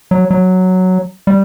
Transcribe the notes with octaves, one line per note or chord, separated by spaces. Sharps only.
F#3
F#3
G3